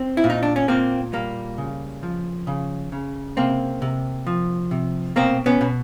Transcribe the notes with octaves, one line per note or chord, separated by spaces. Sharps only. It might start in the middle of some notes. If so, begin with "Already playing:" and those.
Already playing: C4
E4
A#2
D#4
D4
C#4
A#2 A#3 C4
G3 A#3
C#3
F3
C#3
C#3
C3 A#3 C4
C3
F3
C3
B2 A#3 C4
B3 C#4
B2